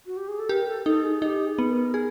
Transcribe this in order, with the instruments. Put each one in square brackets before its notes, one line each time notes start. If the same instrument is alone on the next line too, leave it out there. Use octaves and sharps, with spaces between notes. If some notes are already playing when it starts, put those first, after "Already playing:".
[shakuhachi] F#4
G4
G#4
A4
[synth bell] G4 [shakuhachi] A#4
[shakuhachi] A4
[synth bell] D#4 [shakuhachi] A4
[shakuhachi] G#4
[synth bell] D#4 [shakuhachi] G4
[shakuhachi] G#4
[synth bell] B3
[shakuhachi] A#4
[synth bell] G#4